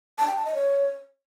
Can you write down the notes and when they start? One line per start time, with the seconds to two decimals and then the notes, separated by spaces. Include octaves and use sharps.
0.18 A5
0.27 G5
0.36 A5
0.45 D#5
0.54 C#5